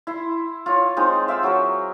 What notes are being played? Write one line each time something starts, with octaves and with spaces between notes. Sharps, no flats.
E4 C6
F4 C#5
G#3 C4 D#4 F4
E5 F5 G5 E6
F#3 F#4 G#4 A#4